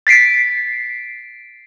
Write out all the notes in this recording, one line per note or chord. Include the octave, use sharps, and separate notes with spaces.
A6 B6 C7 D7